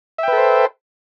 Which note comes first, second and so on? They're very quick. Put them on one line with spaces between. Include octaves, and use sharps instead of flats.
E5 G5 B4 A4 C5